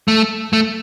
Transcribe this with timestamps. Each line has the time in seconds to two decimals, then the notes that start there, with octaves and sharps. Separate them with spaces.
0.08 A3
0.53 A3